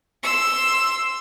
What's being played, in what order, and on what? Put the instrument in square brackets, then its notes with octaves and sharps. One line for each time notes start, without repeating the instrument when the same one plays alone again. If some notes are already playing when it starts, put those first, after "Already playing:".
[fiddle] C6 E6